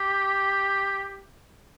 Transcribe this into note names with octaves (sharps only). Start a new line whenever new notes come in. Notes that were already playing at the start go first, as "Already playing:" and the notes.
Already playing: G4